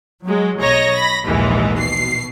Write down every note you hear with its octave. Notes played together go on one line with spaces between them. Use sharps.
F#3 G#3
B1 C#5 D#5 A#5 A#6
B5 A#6
A#1 D#2 G#2 E3 G#3
B2 C7